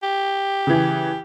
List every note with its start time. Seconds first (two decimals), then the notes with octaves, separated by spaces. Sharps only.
0.03 G4
0.67 C#3 E3